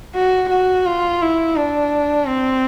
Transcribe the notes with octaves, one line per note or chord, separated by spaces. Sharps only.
F#4
F#4
F4
E4
D4
C4